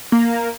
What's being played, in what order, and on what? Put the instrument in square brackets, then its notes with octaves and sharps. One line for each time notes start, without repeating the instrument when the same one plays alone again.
[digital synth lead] A#3